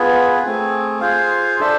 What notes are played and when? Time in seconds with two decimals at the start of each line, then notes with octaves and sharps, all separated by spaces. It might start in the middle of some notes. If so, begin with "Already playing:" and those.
Already playing: B3 F4 G#4 B4
0.43 A3 C4 G#4
1.01 F4 G#4 C5 F5
1.60 D4 A4 C5 E5